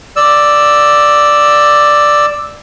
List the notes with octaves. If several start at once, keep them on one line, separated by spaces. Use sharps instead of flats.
D5 E6